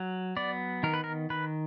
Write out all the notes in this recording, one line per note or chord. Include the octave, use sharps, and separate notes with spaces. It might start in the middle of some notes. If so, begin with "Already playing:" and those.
Already playing: F#3
B3 D5
D#3 A#4
B4
A#4
D#3 B4